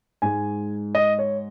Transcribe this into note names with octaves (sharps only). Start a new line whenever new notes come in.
G#2 G#3 G#5
D#5
C#5